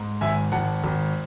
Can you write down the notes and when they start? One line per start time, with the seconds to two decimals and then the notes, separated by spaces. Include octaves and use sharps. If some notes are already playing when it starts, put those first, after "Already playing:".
Already playing: G#2
0.21 G#1 E5 G#5
0.52 G#1 F#5 A5
0.84 G#1